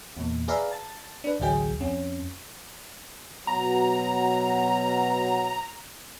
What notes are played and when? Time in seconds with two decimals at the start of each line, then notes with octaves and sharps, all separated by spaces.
0.17 E2 A#2
0.48 G#4 B4 D5 E5 F5 A#5
0.71 A5 A6
1.24 D4 B4
1.40 A1 D2 A2 F#3 G#4 G5
1.80 F2 C#4
3.47 B2 F#3 A#5